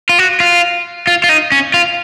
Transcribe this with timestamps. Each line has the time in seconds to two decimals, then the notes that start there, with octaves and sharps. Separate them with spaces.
0.09 F4
0.19 F#4
0.40 F4
1.07 F4
1.24 F4
1.29 D#4
1.52 C#4
1.74 F4